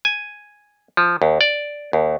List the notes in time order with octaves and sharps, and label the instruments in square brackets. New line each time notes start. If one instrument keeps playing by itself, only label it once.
[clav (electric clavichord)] G#5
F3
D#2
D5
D#2